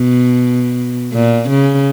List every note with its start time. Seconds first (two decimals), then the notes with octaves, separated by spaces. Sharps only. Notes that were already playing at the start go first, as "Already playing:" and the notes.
Already playing: B2
1.13 A#2
1.49 C#3